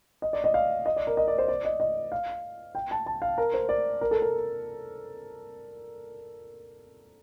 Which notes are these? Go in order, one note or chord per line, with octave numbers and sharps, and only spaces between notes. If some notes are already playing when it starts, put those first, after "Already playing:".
D#5
D5
D#5
F5
D#5
D5
A#4
D#5
D5
C5
D5
D#5
D#5
F5
G5
A5
A5
F5
A#4
C5
D5
A#4
A4
A#4